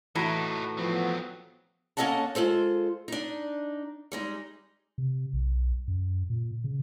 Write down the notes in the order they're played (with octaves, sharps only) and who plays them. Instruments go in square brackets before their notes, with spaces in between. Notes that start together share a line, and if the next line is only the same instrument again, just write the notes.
[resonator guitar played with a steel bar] A2 [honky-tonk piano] E3 F#4 A5 [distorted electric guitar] D#4 B4
[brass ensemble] F3 B3 [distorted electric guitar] F#3 C4
[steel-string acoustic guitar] A#3 C#4 A4 D#5 F#5 A5
G#3 F4 A4 C5
D4 D#4
G3 G#3 D#4
[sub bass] C3
B1
F#2
A#2
C#3